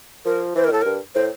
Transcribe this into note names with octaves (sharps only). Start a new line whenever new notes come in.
F3 A#4
E3 C5
A#4
A2 A4
G2 A#4
A2 C5